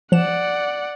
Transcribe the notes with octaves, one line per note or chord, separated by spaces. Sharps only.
F3 D5 F#5 E7